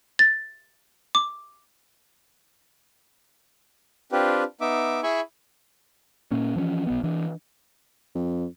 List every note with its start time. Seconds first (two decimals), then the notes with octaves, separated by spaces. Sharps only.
0.19 A6
1.15 D6
4.12 C4 D4 F4 G4 B4
4.61 B3 D#4 E5 D6
5.03 E4 G#4 E5 G#5 B5 C#6
6.31 A#2 A#3 C#4
6.56 E3 F3 G#3 C#4
6.87 B1 B3
7.04 E3 D4
8.15 F2